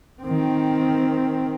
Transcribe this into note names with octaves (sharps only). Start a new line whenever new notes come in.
D#3 C4